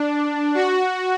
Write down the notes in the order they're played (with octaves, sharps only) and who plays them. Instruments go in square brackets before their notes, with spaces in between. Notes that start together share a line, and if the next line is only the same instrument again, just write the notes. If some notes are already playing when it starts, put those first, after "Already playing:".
Already playing: [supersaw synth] D4
F#4